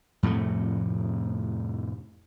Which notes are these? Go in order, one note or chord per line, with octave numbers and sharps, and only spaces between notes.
F2 A2 C3 A3